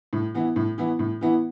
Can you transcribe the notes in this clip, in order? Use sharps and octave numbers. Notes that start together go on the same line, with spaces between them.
A2
E3 B3 E4
A2
E3 B3 E4
A2
E3 B3 E4